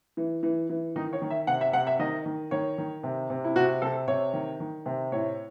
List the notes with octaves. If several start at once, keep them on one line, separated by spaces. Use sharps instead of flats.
E3
E3
E3
D#3 D#4
C#5
D#3
E5
C3 F#5
E5
C3 F#5
E5
D#3 D#5
D#3
D#3 C#5
D#3
C3
C3
E4
C3 F#4
C3 A4
C3 C#5
D#3
D#3
C3
A2 C#5